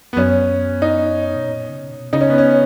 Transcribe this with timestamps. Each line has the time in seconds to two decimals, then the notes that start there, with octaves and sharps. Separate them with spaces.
0.13 B3
0.17 F#2 C#4
0.82 D#4
1.36 B2
1.48 A#2
1.69 C#3
1.91 B2
2.13 C#3 D#4
2.21 C#4
2.30 B3
2.38 C#4